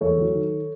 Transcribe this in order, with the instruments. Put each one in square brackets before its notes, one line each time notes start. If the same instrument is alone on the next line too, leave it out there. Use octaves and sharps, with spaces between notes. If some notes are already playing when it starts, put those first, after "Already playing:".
[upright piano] E2 A4 C#5
F#3
D#3